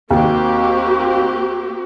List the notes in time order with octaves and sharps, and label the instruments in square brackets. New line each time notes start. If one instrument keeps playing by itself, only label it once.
[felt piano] D#2 [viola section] A#3 C4 G4 [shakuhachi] F#4